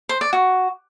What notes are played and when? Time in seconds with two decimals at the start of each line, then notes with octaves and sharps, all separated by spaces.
0.09 C5
0.21 D5
0.33 F#4